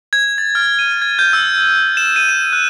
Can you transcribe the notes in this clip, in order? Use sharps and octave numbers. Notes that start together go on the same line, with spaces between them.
G#6
A6
F6
D#7
G#6
G6
E6
E7
D#7
E7
F#6